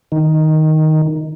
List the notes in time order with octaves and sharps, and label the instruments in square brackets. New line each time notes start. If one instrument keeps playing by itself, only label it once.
[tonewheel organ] D#3